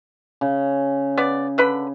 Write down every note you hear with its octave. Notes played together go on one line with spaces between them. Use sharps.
C#3
B3 D5
D3 B4 B5